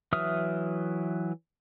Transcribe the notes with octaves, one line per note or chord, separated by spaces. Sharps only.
E3 F#3 E5 D#6 F6